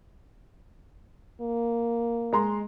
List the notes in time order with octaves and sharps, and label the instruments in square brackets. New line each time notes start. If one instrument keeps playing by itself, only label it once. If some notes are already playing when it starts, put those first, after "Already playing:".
[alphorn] A#3
[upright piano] G#3 A#5 C6